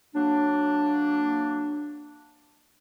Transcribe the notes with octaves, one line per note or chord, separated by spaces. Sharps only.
F#3 A#3 D4